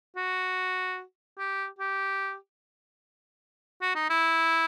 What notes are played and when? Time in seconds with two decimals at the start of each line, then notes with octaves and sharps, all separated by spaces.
0.16 F#4
1.38 G4
1.79 G4
3.81 F#4
3.95 D#4
4.10 E4